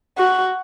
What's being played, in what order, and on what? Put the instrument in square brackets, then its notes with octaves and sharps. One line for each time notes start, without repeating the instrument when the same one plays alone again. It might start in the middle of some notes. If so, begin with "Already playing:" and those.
[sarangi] F#4